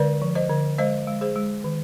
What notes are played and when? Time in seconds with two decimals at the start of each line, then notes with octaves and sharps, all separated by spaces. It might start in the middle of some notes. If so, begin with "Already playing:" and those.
Already playing: D3 G#3 B4 D5
0.22 F3
0.35 C5 D#5
0.49 D3
0.78 G#3 C5 D#5
1.07 G#3
1.21 G#4 C5
1.36 G#3
1.64 D#3